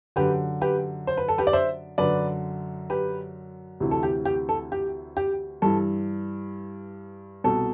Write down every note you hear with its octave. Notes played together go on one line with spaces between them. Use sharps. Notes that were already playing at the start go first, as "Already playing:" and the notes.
F#2 D3 G4 B4
G4 B4
C5
B4
A4
G4 B4
D5
C5 E5
F#2 D3 B4 D5
G4 B4
D2 C3 E3
A4
G4
G4
A4
G4
G4
G2 E3 A4
C2 B2 A4